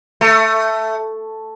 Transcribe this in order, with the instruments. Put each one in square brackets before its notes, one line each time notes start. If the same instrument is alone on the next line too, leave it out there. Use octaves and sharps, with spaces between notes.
[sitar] A3